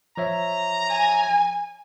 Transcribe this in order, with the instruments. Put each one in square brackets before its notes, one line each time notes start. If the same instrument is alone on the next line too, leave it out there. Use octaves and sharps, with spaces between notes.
[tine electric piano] F3 C#5 E5 [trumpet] A#5
[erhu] G#5